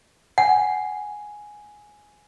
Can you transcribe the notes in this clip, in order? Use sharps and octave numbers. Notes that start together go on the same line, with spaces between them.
F#5 G#5